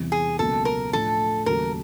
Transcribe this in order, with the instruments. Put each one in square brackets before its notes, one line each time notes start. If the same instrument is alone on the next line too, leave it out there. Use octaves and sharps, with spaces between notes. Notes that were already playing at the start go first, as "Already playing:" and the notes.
Already playing: [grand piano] E2 C3 E3 G3 C4
[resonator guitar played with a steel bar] G#4
[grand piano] C#2 B2 F#3 A#3 [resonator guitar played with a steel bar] A4
[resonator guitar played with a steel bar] A#4
[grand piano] A2 F3 A3 D4 [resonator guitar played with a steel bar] A4
[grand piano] D#2 C#3 F#3 A3 [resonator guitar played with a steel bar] A#4